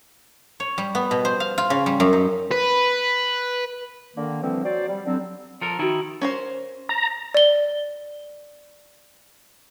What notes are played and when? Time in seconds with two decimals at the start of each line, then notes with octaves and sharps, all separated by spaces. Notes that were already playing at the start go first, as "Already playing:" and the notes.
0.60 C#5
0.78 G3
0.95 B3
1.11 B2
1.25 C5
1.40 F5
1.58 F4
1.70 C#3
1.86 G3
2.00 F#2
2.13 D#4
2.51 B4
4.16 D3 D#3 A#3
4.42 D3 E3 F3 G3 C4
4.64 F#3 C5 D5
4.88 G3
5.05 D3 F#3 C4
5.61 F3 A4 A#4
5.79 D#3 D#4 E4 F#4
6.21 C#4 A#4 C5
6.89 A#5
7.35 D5 G7